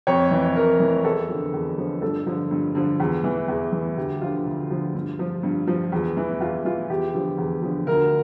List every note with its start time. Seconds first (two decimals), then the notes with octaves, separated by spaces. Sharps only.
0.07 F2 C#5
0.31 E3
0.56 F2 A#4
0.80 E3
1.04 E2 A4
1.29 D3 F3
1.53 E2
1.78 D3 F3
2.02 G2 A4
2.26 D3 F3
2.51 G2
2.75 D3 F3
3.00 E2
3.24 E3
3.48 E2
3.73 E3
3.97 D2 G4
4.21 D3 F3 F4
4.45 D2
4.70 D3 F3
4.95 G2
5.19 F3
5.43 G2
5.67 F3
5.92 E2
6.17 E3
6.40 E2 F4
6.65 E3 F4
6.90 E2 G4
7.14 D3 F3
7.38 E2
7.62 D3 F3
7.87 D2 A#4